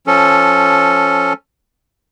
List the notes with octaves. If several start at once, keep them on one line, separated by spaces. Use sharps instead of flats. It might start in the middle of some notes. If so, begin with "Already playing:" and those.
F3 C#4 A4